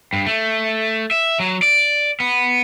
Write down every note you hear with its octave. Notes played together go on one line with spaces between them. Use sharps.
G2
A3
E5
F#3
D5
B3